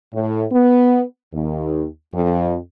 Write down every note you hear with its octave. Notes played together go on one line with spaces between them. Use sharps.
A2
B3
D#2
F2